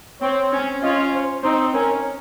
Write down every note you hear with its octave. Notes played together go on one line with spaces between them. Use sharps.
C4 C#5
C#4
C#4 F4 D#5
C5
C4 D#4 C5
C#4 A#4